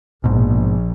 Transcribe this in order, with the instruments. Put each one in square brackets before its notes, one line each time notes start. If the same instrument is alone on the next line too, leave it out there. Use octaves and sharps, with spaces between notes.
[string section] A#1 [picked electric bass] G#2 B2